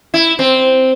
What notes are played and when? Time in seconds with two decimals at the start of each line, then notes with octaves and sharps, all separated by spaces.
0.14 E4
0.39 C4